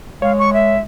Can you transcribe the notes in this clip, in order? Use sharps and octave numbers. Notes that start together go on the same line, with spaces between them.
G#3 C#5 F5
C#6
E5